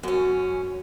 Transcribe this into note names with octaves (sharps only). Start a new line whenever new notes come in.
F#2 C#4